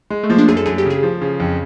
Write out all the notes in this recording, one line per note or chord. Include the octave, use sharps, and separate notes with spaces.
G#3
A3
F3 A#3
D4
F#2 G#4
A4
F#2 G#4
G4
C#3 G#4
F3
C#3
F2